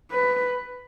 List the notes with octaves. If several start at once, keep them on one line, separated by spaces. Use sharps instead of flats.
B4